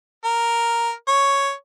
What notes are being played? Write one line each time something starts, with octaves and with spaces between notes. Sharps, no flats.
A#4
C#5